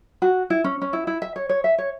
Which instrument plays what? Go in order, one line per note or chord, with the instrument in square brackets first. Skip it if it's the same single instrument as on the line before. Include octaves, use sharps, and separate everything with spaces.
[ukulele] F#4
E4
C#4
C#4
E4
E4
E5
C#5
C#5
E5
C#5